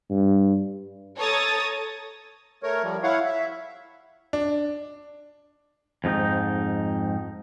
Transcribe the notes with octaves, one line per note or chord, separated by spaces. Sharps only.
G2
A4 C#5 A#5 D#6 A6
A3 A#4 C#5
F3 G3
E4 C#5 F5 F#5
E5
D4
F2 G#2 D#4